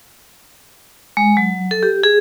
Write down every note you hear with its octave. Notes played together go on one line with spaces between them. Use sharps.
G#3
F#3
A4
G4
G#4